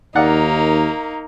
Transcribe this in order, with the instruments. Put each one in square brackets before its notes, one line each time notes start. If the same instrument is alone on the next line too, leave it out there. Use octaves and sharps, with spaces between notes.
[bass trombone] D#2 [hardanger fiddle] A#3 D#4 [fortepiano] D5 F5 F#5